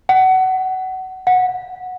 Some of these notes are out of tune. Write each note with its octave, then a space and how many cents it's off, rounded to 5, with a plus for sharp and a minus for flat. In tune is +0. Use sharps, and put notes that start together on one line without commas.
F#5 +25
F#5 -15